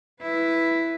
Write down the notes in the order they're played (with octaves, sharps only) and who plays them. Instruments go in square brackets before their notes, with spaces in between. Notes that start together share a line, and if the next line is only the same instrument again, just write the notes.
[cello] E4 B4